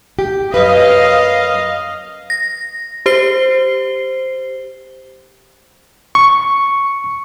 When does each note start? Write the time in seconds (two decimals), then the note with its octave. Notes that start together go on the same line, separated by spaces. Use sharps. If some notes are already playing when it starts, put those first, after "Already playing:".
0.19 G4
0.54 F#2 B4 D#5 F5
2.30 A#6
3.06 G4 C5 C7 G7
6.15 C#6